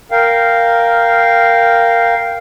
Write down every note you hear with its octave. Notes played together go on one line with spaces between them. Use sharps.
A#4 F5 G5